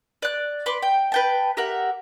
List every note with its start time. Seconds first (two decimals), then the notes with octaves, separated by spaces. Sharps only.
0.22 D5 F#6
0.66 B4 C6 D6
0.83 G5
1.12 B4 G5 A5
1.57 G4 A#4 E5 F#5